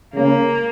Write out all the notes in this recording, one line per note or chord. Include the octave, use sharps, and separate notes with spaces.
C#3 A#3